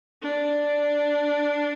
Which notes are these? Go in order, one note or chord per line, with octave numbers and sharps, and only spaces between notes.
D4